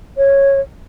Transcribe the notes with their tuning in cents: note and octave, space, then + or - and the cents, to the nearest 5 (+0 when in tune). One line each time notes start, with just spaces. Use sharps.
C#5 -10